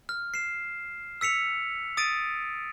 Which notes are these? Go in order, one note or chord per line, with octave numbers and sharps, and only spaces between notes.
F6
C7 E7
E6 B6 C#7 F7
D#6 A6 D7 D#7